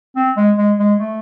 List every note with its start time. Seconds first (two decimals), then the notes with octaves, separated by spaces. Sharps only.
0.16 C4
0.37 G#3
0.58 G#3
0.79 G#3
1.00 A3